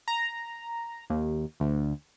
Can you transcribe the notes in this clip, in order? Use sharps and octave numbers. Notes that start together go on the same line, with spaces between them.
A#5
D#2
D2